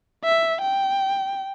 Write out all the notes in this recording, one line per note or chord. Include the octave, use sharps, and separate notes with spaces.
E5
G5